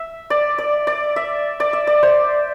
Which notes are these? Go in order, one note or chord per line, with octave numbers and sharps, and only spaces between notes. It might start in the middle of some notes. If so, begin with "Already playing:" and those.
Already playing: E5
D5
D5
D5
E5
D5
E5
D5
C5